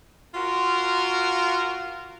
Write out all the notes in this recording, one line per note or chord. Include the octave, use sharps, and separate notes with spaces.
F4 F#4 A#4